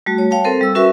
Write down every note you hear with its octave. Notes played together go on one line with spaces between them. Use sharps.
G3 A3 F#4
C#5
C#5 F5 G5 A5
C4 A4 A#4 C5
G3 E6
C#4 F#4 A#4 B4 E5 C#6